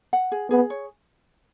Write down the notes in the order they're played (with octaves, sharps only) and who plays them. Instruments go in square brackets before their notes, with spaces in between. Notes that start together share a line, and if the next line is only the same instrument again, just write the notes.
[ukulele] F#5
G#4
[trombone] B3 [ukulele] G#4
[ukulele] C#5